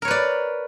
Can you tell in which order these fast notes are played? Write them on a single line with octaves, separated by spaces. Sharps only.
A#4 C#5 B4 D5